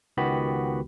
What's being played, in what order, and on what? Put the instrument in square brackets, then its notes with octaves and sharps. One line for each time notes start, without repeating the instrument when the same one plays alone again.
[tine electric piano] C#2 D#3 B3 F#4 G4 B5